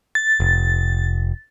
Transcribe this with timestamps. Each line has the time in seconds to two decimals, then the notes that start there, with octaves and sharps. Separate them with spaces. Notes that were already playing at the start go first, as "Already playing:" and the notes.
0.15 A6
0.40 F1